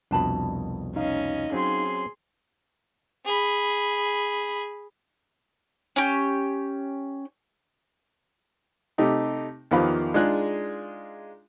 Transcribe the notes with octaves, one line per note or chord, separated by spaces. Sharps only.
C2 F2 B2 D4 A5 B5
C#4 D#4 D#5 F5
F#3 C4 C#4 G#4 C6
G#4 B5
C#4 G4
C3 A3 D#4 G4
E2 D#3 F3 G4 F5 B5
G#3 D4 D#4 F4 G#4 F#6